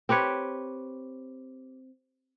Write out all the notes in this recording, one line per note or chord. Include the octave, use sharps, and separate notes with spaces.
C4 G4 B4 C#5